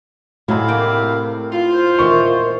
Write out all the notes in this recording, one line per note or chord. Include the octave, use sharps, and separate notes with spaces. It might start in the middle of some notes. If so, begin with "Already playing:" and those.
A2 C3 F#3 G#3 E4 F5
A#3 G4 G5
F4 C6
C5
A#2 D#3 E3 C#6